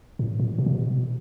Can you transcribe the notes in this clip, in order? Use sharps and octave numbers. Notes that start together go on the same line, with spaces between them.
A2
A#2
B2
C3
B2